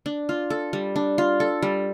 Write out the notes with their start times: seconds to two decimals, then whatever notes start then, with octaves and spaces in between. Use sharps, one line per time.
0.06 D4
0.29 F4
0.50 A4
0.73 G3
0.96 D4
1.18 F4
1.40 A4
1.62 G3